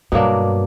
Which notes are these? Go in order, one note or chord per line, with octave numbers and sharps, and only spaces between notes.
G2 B2 F#3 A#3 D4